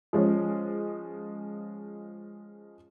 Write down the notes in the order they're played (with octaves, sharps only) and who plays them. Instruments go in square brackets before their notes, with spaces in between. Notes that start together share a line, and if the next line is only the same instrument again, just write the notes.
[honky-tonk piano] F3 G#3 C#4